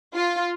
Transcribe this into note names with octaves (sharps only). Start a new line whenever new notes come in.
F4